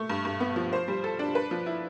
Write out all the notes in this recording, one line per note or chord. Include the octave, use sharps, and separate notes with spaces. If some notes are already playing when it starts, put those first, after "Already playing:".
Already playing: A3
G2
G2
B3
F3
C5
G3
A4
D4
B4
F3
E4